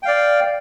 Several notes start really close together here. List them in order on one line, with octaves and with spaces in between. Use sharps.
G5 F5 D5